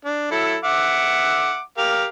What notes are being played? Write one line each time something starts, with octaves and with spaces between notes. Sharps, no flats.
D4
F#3 E4 A4
E5 F#5 D6
G4 A#4 F5